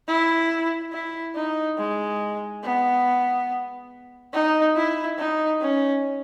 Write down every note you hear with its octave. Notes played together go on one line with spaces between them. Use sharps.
E4
E4
D#4
G#3
B3
D#4
E4
D#4
C#4